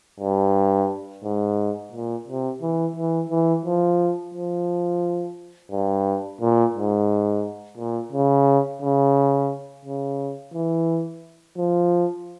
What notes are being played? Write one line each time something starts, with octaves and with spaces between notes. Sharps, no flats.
G2
G#2
A#2
C3
E3
E3
E3
F3
F3
G2
A#2
G#2
A#2
C#3
C#3
C#3
E3
F3